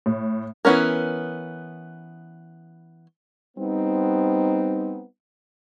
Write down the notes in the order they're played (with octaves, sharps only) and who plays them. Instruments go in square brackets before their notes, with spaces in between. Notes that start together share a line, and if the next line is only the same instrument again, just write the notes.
[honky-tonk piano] A2
[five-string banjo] E3 F#3 B3 C#4 A#4
[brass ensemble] G3 B3 C4 D#4